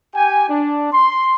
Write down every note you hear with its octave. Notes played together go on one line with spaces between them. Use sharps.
G4 G5 G#5
D4
C6